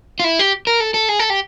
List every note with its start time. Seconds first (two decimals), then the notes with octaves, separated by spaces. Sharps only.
0.20 F4
0.24 E4
0.39 G4
0.67 A#4
0.80 A4
0.94 A4
1.09 G#4
1.19 A4
1.30 G4